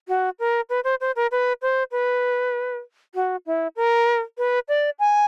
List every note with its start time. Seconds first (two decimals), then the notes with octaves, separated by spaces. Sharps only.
0.08 F#4
0.39 A#4
0.70 B4
0.84 C5
1.01 C5
1.16 A#4
1.31 B4
1.62 C5
1.92 B4
3.15 F#4
3.46 E4
3.76 A#4
4.38 B4
4.69 D5
4.99 G#5